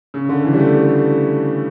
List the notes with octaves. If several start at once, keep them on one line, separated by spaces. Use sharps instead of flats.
C#3
D3
E3
G3
A3